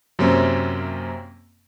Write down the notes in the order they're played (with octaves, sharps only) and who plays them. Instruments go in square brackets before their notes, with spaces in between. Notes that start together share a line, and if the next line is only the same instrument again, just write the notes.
[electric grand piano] F#2 C3 A#3 C4 C#4